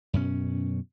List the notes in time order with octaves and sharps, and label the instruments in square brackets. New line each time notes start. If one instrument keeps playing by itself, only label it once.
[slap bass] F#2 B2 C#4